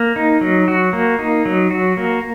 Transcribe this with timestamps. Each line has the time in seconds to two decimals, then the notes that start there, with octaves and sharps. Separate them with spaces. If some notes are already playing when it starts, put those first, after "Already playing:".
Already playing: A#3
0.16 D#4
0.41 F#3
0.68 F#4
0.93 A#3
1.19 D#4
1.45 F#3
1.71 F#4
1.97 A#3